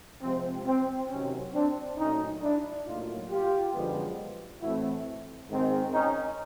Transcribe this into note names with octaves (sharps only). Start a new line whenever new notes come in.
C3 F3 G#3 C4
C4
C3 D#3 F#3 C#4
C4 D4
A#2 F#3 A3 C#4 D#4
D4 E4
A2 F#3 A#3 D#4 F4
F4 G4
F#2 D3 F3 G#3 B3
A2 E3 A3 C4 E4 F#4
G#2 D#3 G#3 C4
C#4 D#4